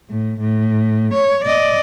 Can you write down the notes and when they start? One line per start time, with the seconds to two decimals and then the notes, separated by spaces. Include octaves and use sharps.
0.10 A2
0.41 A2
1.14 C#5
1.45 D5 D#5